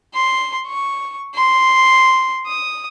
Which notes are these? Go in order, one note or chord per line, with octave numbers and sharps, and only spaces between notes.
C6
C#6
C6
D#6